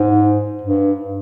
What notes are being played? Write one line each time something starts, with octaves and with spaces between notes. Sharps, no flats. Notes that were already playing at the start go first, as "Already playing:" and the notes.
Already playing: G#2
G2